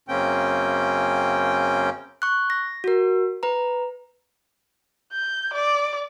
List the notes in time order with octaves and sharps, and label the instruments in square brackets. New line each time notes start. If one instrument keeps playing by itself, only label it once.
[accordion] F#2 C#3 A#3 C4 C#4 G5
[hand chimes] C#6 F#6
A#6
F#4 A#4
B4 A#5
[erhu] G6
D5